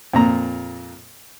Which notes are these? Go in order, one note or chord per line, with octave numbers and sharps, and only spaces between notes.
F2 A#2 A#5